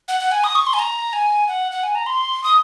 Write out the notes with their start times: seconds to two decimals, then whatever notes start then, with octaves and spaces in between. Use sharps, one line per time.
0.08 F#5
0.20 F#5
0.32 G#5
0.44 D#6
0.55 C#6
0.67 C6
0.74 G#5
0.79 A#5
1.13 G#5
1.48 F#5
1.71 F#5
1.83 G#5
1.95 A#5
2.06 C6
2.44 D#6